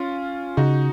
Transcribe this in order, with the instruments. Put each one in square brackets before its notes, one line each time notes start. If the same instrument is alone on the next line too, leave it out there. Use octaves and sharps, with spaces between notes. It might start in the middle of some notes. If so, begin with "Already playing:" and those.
Already playing: [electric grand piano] C#4 F4
[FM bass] C#3 [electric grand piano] D#4 F#4